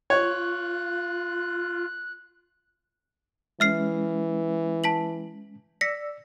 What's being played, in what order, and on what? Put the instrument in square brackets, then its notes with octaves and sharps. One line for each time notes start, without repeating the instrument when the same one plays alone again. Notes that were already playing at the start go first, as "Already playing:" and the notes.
[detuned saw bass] F4 [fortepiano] C#5 [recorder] F#6
[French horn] E3 [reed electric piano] G#3 C#4 [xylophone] E5 F6 C7
[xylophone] A5 B6 F#7
[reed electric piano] D5 E6 [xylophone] A#6 B6 C#7